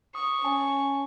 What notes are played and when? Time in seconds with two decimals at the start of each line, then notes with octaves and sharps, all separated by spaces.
0.15 C#6 D#6
0.44 C#4 G#5 A5